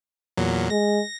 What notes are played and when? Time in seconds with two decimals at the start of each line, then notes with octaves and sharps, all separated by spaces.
0.37 E2 A#2 F#3
0.70 G#3 A#6